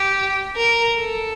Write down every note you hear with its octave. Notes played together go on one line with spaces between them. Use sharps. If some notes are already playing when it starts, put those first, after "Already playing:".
Already playing: G4
A#4
A4